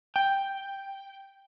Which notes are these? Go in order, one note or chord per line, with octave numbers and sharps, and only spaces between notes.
G5